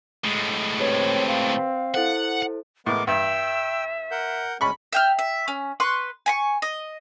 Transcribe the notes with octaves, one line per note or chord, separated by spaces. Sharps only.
A2 G#3
C4 G4 B4 C#5
F5
E4 A4 C5 F#5
A2 G#3 B3 A#4 D6
G2 E5 G5 E6
A#4 F#5 G6
D2 G#3 C#4 B5 C#6
E5 G5 F6
E5
C#4
B4 C6 C#6 F#6
G#5 B5 C#6
D#5